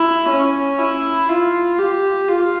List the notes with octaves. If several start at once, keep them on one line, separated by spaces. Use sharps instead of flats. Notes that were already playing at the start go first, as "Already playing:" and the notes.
Already playing: E4
C#4
E4
F4
G4
F4